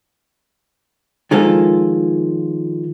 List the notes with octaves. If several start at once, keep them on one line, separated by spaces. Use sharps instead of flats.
D#3 F3 G#3 A#3 F4 A4